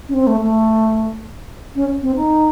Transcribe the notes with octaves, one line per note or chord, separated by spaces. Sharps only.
C#4
C4
A3
A3
C#4
C4
D#4